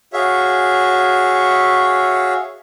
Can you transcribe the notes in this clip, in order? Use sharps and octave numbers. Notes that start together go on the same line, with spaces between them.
F#4 G#4 C#5 E5 F5